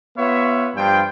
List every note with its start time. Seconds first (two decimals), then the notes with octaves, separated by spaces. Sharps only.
0.17 B3 F4 B4 C#5 E5
0.76 G2 F3 F4 G5